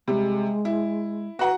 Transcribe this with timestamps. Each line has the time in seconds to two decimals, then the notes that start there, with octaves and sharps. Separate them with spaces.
0.08 C3 G3 G#3
0.65 E4
1.39 F#4 B4 F#5 A#5